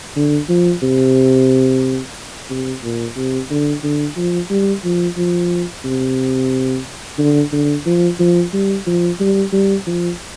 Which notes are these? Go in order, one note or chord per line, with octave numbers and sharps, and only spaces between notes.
D3
F3
C3
C3
A#2
C3
D3
D3
F3
G3
F3
F3
C3
D3
D3
F3
F3
G3
F3
G3
G3
F3